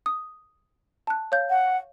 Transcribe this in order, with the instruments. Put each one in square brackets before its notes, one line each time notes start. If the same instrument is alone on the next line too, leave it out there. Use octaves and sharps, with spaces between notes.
[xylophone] D#6
A5 F#6
C#5 F5 G6
[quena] F#5